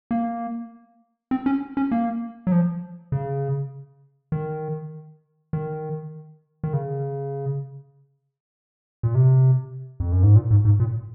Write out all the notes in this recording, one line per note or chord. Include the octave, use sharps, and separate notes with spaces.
A#3
C4
C#4
C#4
A#3
F#3
F3
C#3
D#3
D#3
D#3
C#3
A#2
C3
F2
F#2
G#2
A#2
G#2
G#2
A#2